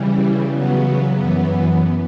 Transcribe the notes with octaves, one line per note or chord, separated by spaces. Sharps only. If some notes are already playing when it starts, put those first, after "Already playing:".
Already playing: C#3 E3 G3
C#3 F#3 B3
F#2 E3 B3